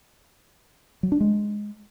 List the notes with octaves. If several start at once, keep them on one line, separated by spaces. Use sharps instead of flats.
F#3
D4
G#3